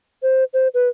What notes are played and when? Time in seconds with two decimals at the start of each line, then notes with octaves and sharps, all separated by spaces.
0.23 C5
0.53 C5
0.74 B4